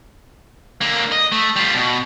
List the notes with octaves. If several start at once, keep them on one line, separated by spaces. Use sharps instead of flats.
D3 A#3
D#5
A3
G3 F4
B2